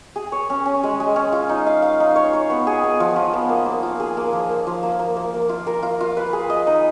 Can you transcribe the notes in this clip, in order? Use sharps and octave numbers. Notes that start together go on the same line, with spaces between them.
G#4
C#5
C#4
C#4
G#3
G#3
C#4
F4
D#4
F5
F5
D#4
C#5
C#5
B3
G#4
B3
F3
F3
B3
A#3
A#3
F4
G#4
A#3
F3
A#3
F3
A#3
A#3
A#3
A#3
F4
A#4
F4
F4
B4
G#4
D#5
D#4